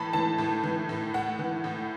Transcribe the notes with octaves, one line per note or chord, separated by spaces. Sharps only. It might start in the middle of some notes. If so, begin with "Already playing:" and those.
Already playing: A2 E3 A5 B5
E3 A5
A2
E3
A2
A2 F#5
E3
A2